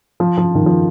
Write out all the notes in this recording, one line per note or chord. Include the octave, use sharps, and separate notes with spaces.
F3
F3
D#3
F3